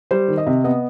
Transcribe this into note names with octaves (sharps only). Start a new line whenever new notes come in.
G3 C5
D#3
D#5
C3
B3 D#5